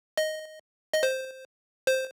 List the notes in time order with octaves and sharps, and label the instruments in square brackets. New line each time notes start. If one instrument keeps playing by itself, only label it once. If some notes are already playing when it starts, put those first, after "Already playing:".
[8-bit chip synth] D#5
D#5
C5
C5